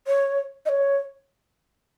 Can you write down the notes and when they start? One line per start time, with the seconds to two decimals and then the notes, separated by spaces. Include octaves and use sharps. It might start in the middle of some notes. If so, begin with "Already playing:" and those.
0.07 C#5
0.65 D#5
0.69 C#5